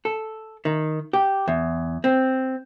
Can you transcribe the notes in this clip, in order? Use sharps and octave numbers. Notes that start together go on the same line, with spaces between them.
A4
D#3
G4
E2
C4